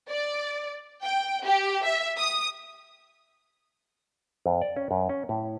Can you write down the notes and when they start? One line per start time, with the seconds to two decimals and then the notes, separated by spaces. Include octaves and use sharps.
0.10 D5
1.03 G5
1.44 G4
1.85 E5
2.18 D#6
4.46 F2
4.62 D5
4.77 C#4
4.91 F#2
5.09 C#4
5.29 A2